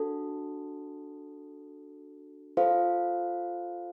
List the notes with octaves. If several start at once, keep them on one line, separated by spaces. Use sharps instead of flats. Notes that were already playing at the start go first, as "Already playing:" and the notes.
Already playing: D4 F#4 A4
F4 A4 C5 F5